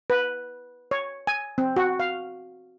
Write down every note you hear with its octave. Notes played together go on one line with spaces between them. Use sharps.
B4
C#5
G#5
C4
F#4
F5